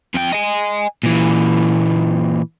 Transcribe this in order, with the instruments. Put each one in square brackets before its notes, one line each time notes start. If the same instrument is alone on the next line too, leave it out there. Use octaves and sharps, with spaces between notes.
[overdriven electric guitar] F2 G5
D#5 G#5
A#2 E3